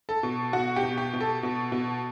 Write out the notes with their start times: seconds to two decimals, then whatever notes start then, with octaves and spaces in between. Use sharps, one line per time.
0.09 A4
0.23 B2
0.53 B2 F#4
0.76 G4
0.83 B2
0.98 G4
1.13 B2
1.20 A4
1.43 B2
1.72 B2